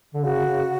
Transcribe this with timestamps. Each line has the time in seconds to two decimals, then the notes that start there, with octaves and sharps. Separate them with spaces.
0.14 D3
0.24 C#3 F#4
0.45 C#3